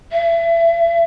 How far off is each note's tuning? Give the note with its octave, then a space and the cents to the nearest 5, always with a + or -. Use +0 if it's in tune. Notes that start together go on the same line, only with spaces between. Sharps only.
E5 +30